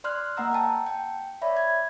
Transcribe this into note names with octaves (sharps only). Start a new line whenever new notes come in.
D5 C6 F6 F#6
A#3 D#5 F#5 A#5 E6
F#5 G5 A5
G5
C#5 D5 E5 B5
G#6